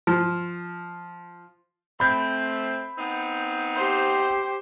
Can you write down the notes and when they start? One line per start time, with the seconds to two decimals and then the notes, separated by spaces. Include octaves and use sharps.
0.07 F3
2.00 A3 C4 B5 G6
2.97 B3 C4 D#4
3.75 G4 C5